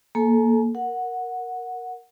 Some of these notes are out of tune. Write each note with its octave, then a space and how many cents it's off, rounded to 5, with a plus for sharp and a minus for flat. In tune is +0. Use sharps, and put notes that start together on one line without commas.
A#3 +0 A4 -25 G#5 +40
A#4 +0 F#5 -10